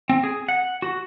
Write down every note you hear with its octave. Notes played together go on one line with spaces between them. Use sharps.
C4
G#4
F#5
F#4